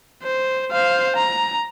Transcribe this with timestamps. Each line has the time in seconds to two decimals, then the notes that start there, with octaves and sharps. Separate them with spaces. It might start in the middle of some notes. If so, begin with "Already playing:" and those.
0.23 C5
0.71 C5 F5
1.16 A#5